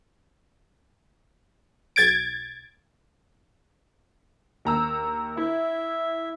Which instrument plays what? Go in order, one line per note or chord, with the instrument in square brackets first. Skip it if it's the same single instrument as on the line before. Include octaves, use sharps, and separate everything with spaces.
[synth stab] B1 G#6 A6 D7
[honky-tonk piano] D#2 A#5 E6
[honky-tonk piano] E4 [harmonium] E5